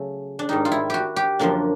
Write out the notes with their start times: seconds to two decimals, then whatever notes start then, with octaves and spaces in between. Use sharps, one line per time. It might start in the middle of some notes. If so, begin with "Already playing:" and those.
Already playing: C#3 F#3 A3
0.39 D4
0.49 G#2 D#3 G3 D#4
0.65 F4
0.72 E4
0.90 F#4 G4
1.16 G4
1.39 F#2 D3 F3 A#3 D4